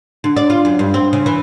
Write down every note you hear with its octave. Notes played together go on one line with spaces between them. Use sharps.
D3
D5
F4
F#2
G2
C4
C#3
E3